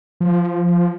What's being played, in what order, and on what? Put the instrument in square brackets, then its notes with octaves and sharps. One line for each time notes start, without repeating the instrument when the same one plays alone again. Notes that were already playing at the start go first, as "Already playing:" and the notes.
[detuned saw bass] F3